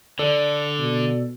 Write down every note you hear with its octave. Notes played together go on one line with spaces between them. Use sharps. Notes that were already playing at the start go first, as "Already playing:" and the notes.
D3 A4 D5
B2